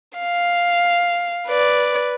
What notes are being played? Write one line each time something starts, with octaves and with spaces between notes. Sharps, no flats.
F5
B4 D5